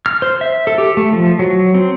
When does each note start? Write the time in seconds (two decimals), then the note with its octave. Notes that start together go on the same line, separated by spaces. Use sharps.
0.06 F6
0.22 C5
0.41 E5
0.67 A4
0.78 G4
0.97 A3
1.13 F3
1.39 F#3
1.74 C4